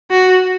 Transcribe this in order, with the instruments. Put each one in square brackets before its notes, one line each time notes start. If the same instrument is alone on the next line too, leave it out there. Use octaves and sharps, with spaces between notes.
[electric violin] F#4